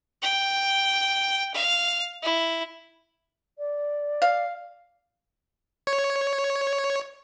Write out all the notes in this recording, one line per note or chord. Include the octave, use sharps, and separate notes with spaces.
G5
F5
E4
D5
F5
C#5